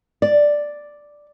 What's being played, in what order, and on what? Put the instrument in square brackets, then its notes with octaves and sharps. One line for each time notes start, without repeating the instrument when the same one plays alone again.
[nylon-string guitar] D5